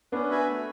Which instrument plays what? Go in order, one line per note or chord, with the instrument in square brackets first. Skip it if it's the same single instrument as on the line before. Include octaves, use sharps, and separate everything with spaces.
[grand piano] B3 D4 [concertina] C#4
[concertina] F#4 B4 E5 G#5
A3